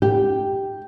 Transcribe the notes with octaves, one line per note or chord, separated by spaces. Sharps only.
G4